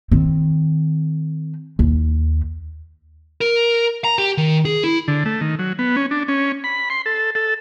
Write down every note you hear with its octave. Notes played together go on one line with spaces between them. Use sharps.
D#3 C4
D#2
A#4
A#5
G4
D#3
G#4
E4
D3
A3
D#3
F#3
B3
C#4
D4
C#4
B5
C6
A4
A4